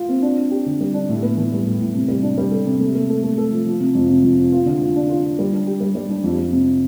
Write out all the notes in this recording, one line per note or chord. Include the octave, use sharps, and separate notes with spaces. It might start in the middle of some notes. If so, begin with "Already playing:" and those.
Already playing: F4
C4
D4
D4
G4
D3
G3
D4
A2
B3
E3
G3
A2
A2
C3
G3
D4
G3
A4
C3
A3
A3
A3
A3
A4
F3
F3
C3
F2
C3
F2
F3
F4
D3
F4
D4
F4
F4
G3
D4
G4
G3
G3
D4
F2
F2
C3